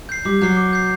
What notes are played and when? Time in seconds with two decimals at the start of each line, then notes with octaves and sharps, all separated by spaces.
0.09 G6 C7
0.25 G3 D6
0.41 F#3 G6 C7
0.57 D6
0.73 G6 C7